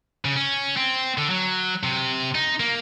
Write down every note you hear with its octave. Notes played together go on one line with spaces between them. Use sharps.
C#3
C#4
C4
D3
F#3
C3
D#4
A#3